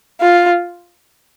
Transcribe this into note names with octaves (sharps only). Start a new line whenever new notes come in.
F4